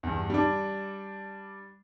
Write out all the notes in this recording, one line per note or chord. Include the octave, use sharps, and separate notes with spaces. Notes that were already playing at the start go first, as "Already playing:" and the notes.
E2 G2
G3 D4